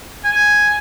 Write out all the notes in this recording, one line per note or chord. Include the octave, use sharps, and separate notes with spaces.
G#5